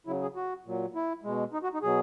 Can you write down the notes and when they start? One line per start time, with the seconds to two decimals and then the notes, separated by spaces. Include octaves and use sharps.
0.07 C#3 F#3 E4
0.22 G#4
0.36 F#4
0.65 A#2 F#3
0.95 E4
1.24 B2 G#3
1.53 D#4
1.63 F#4
1.74 D#4
1.82 B2 F#3 G#4